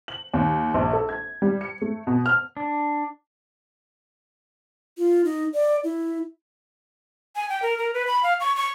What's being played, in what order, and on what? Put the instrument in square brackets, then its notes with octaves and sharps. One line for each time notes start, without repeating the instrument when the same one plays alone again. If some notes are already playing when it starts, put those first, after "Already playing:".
[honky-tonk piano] F#7
D#2
A#1
A4
G#6
G3
C#7
A3
B2
F6
[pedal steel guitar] D4
[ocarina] F4
D#4
D5
E4
[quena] G#5
G5
A#4
A#4
B4
B5
F5
C#6
C#6